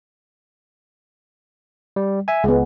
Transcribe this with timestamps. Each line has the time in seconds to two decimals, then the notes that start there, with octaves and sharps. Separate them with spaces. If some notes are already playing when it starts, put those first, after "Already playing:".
1.96 G3
2.28 E5 G#5
2.44 C#2 G#3 B3